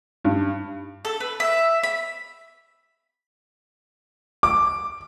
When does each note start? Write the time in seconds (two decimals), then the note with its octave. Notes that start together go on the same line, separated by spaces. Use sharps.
0.25 G2
1.05 A4
1.20 B4
1.40 E5
1.83 B5
4.43 D6